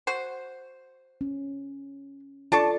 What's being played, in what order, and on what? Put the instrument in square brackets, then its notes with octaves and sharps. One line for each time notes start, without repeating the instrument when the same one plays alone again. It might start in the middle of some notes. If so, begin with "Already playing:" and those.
[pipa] F#4 C5
[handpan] C#4
[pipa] D4 A5 C#6 [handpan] F4 A4 D5